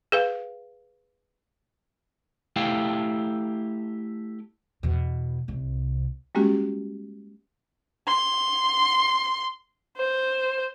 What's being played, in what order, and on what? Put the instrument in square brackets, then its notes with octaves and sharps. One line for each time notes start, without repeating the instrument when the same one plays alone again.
[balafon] G#4 B4 F5
[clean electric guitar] A3 E4 G4 F5 G5
[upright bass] E2 B2
C2 C3
[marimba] G3 G#3 A#3 C#4 F#4 G4
[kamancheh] C6
C5